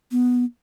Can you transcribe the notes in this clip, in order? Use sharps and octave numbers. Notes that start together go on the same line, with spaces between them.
B3